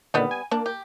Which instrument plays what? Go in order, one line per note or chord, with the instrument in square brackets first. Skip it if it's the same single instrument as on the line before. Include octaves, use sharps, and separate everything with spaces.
[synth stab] A#2 D3 D#3 [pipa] G3 B3
[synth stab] G#5
[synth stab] A#3 [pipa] D4
[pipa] G4